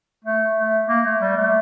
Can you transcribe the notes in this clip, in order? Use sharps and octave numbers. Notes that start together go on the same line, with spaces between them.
A3
A3
A#3
A3
G3
A3